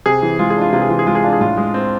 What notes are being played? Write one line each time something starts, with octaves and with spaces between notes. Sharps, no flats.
C3 G#4
E3
G#3 F4
G#4
D4 F4
C3 F4
G#4
E3 F4
G#4
G#3 F4
G#4
D4 F4
G#4
A2 F4
G#3
C4